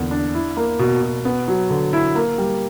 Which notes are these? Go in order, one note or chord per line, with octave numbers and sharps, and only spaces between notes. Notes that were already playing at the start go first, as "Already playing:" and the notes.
Already playing: E2 D3 A#3
D4
E4
A#3
B2
B2
B3
F#3
D3
E4
A#3
G3